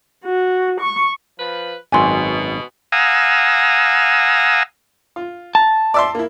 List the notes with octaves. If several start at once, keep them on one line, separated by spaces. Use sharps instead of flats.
F#4
C#6
F3 B4
G#1 F#2 B2 F#3 G#5 C6
F5 F#5 G#5 A#5 D#6 E6
F4
A5 A#5
D5 E5 C6
A#3 E4